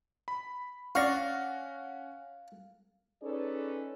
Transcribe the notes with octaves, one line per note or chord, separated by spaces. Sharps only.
B5
C#4 D5 F5 F#5 C#6 A#6
C#4 D#4 G#4 A4 B4 D5